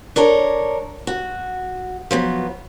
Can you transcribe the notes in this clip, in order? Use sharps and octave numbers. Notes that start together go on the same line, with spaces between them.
D4 A4 A#4 C#5
F#4
F3 F#3 B3